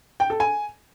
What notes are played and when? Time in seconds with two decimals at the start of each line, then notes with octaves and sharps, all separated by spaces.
0.20 G5
0.30 A4
0.40 G#5